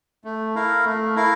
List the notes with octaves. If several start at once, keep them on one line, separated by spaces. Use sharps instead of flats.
A3
E4 A#4 F5
A3
E4 A#4 F5